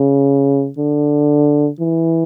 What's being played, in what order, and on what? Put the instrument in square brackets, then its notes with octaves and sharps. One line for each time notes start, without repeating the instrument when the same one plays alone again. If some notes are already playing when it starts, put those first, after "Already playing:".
Already playing: [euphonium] C#3
D3
E3